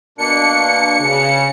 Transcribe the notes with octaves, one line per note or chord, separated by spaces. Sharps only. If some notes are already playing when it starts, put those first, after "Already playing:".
B2 A#3 D4 C#7
C#3